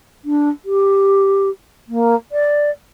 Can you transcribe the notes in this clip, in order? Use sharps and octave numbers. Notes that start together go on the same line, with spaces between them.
D4
G4
A#3
D5